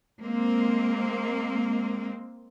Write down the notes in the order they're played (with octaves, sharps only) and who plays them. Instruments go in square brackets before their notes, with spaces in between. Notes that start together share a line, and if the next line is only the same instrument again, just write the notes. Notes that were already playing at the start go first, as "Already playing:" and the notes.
[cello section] G#3 A#3 C4